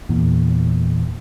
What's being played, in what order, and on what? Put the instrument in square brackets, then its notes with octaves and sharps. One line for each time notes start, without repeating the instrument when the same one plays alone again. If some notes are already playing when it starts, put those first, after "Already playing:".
[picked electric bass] E2 A#2